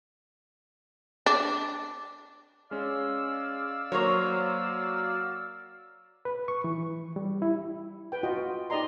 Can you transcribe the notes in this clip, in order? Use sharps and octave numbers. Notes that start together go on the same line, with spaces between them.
D4
G#3 C#4 D5 F5 E6
F#3 A#3 A#4 C5 C#5
B4
C#6
E3
G3
E4
B4 G5
F4 F#4 D#5 G5
D#4 G4 D5 D#5 A#5 C6